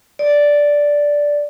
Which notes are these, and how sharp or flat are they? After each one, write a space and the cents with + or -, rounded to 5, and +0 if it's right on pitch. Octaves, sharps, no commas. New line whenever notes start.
D5 -5